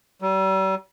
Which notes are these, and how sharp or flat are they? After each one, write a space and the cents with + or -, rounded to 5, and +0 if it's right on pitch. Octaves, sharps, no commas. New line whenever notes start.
G3 -40